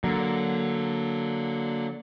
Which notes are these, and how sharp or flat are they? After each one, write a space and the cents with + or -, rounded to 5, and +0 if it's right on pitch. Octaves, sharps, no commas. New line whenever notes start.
D3 +0 F#3 +0 A#3 +0